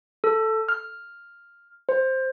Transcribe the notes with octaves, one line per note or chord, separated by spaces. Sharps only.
A4
F6
C5